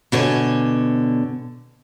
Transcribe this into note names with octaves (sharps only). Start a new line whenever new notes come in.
B2 D3 C#5 D5 G#5